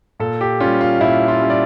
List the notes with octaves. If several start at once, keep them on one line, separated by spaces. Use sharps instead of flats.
A#2 A4
G4
G3 C#4 F4
F4
A#2 E4
F4
G3 C#4
D5